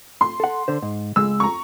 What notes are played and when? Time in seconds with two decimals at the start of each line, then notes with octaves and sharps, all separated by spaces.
0.21 C6
0.40 A4 F#5
0.68 D3 C5
0.82 G#2
1.16 C#2 G#3 E6
1.40 A#5 C#6